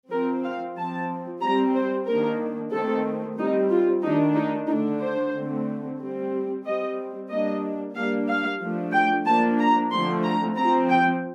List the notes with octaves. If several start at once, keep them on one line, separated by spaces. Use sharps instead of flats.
F3 C4 A#4
F5
F3 C4 A5
G3 C4 A#5
C5
D#3 A#3 D4 A#4
D#3 A3 C4 A4
G3 C4 D#4
F4
D#3 A3 D4 D#4
D#4
D3 A3 D4 D#4
C5
D3 A3 C4
G3 C4
G3 C4 D#5
G3 A#3 D4 D#5
G3 A#3 D4 F5
F5
F3 A3 D4
G5
F3 A#3 D4 A5
A#5
D3 F3 A3 C4 C6
A#5
F3 C4 A#5
G5